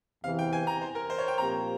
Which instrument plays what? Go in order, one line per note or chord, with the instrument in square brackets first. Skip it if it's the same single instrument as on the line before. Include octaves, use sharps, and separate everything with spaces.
[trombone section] E2 C3 E3 [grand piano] F5
[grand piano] G5
G#5
A#5
C5
A#4
C5
C#5
G5
[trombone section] A#2 F3 C4 G4 A#4 [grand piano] A#5